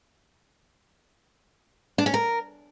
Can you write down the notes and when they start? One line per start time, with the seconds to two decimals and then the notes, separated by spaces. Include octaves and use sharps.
1.98 D4
2.06 C#4
2.14 A#4